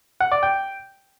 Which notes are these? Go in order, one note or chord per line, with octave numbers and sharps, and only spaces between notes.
F#5
D5
G5